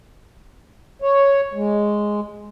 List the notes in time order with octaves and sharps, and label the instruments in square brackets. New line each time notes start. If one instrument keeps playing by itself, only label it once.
[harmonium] C#5
G#3